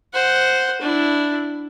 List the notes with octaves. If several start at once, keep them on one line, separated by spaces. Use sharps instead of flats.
C5 F#5
D4 E4